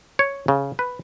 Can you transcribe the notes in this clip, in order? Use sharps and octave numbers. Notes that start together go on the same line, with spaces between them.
C#5
C#3
B4